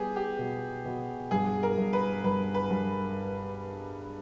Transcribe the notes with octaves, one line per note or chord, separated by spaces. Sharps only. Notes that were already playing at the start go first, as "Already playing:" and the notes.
Already playing: G3 B3 G4 G#4
G4
B2
B2
G2 G#4
A#4
G2
B4
G2 B4
B4
G2